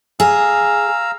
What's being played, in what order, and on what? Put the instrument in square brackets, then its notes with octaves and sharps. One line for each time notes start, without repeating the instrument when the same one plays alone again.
[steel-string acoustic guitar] G#4 [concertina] F5 A#5 E6